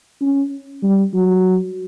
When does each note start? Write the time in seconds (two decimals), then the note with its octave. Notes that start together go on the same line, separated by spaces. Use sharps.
0.22 C#4
0.83 G3
1.14 F#3